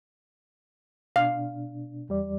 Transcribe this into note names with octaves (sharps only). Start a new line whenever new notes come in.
B2 D4 F5
E2 G3 D5